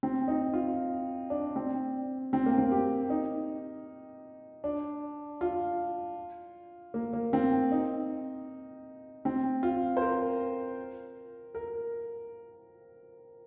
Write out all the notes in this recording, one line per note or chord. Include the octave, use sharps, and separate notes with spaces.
C4
D#4
F4
D4
C4
C4
A#3
C4
G4
D#4
D4
F4
A#3
A#3
C4
D#4
C4
F4
C5
A#4
A#4